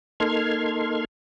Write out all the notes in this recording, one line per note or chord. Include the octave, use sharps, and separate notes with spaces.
A#3 D#4 A4 C6 F6 G#6